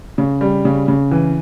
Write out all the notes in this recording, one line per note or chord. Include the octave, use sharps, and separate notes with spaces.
C#3
G3
C#3
C#3
E3